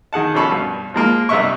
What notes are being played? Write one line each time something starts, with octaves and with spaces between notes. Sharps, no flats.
D#3 G#4 F#5 A5
A#1 B2 C#4 A4 B5 C#6
G2 B2
F3 G#3 A#3 F4
G2 C3 B3 D#5 E5 C#6